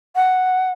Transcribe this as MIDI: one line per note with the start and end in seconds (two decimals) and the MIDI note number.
0.15 0.70 78